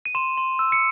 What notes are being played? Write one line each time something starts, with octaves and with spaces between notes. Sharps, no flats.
D#7
C6 E7
C6
E6
C#7